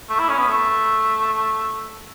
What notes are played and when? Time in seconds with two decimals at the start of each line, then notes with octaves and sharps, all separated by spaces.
0.10 A3
0.19 E4
0.29 C#4
0.38 B3
0.48 A3